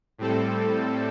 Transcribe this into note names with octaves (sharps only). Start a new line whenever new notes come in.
A2 G3 C4 A4